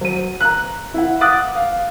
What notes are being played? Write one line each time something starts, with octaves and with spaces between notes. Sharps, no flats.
F#3 D#7
A#5 F#6
E4 F#5
F#5 D6 D#6 F#6 A6
F5